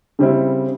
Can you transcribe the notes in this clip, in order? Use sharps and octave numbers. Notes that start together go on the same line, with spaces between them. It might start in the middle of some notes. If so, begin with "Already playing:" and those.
C#3 G3 C4 E4